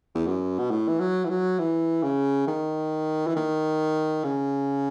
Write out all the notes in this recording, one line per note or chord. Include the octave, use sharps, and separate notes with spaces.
E2
F#2
B2
A2
E3
F#3
E3
F#3
E3
C#3
D#3
E3
D#3
C#3